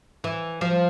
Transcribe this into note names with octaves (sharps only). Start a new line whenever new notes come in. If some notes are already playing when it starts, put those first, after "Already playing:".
E3
F3